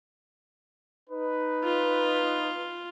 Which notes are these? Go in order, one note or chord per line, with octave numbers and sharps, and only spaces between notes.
D#4 B4
F4